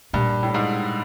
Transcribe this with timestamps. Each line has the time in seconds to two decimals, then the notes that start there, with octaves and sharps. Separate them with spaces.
0.13 G2 A#2
0.43 A2
0.54 G#2